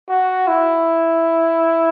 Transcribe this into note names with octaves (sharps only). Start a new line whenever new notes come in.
F#4
E4